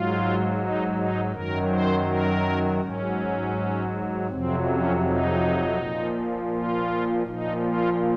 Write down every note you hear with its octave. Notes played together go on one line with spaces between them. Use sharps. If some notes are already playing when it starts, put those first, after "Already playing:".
Already playing: G#2 F#3 F4
D#4
D#4
F#2 D#3 F#3 A#4
C5
A#4
G#2 F#3 C#4
F2 C3 F#3 C4
C#4
D#4
A#2 F3
F4
A#2 F3 D#4
F4